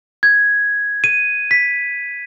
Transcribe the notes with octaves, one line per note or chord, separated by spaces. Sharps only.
G#6
D#7
B6